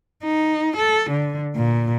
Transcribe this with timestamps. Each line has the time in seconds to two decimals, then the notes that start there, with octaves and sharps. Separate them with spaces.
0.24 D#4
0.77 A4
1.10 D3
1.56 A#2